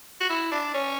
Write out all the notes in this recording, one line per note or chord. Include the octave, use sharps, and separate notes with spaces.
F#4
E4
D4
C#4